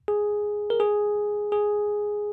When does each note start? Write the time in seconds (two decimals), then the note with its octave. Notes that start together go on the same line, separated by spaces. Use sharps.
0.08 G#4
0.70 A#4
0.80 G#4
1.52 G#4